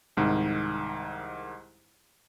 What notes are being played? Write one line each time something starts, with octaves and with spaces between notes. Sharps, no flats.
C2 G#2 D#3